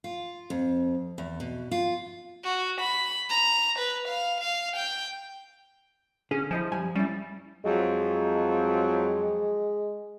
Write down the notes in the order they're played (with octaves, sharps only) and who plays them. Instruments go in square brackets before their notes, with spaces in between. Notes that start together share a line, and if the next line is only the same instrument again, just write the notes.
[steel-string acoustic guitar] F4
F2
E2
B2
F4
[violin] F#4
B5
A#5
B4
F5
F5
G5
[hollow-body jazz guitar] D3 G#4 [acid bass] C#4
[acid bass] F3 [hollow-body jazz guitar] E4 D#5 G#5
[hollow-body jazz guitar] F#2 G3 G#5
[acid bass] G3 [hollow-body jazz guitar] C#4 E4
[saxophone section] F2 F#3 [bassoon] G#3